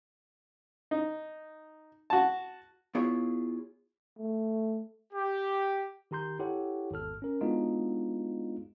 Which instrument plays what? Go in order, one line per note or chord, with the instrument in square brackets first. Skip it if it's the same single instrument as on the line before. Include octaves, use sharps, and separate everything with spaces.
[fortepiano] D#4
F#4 A5
[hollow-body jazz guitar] B3 E4 F4 G#4 C#5
[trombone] A3
[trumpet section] G4
[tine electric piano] D#3 G4 A#5 C6 G6
E4 G4 A4 C#5 F#5
G#1 E2 A4 F6
C#4 A#4
G#3 B3 D4 D#4 F4 F#4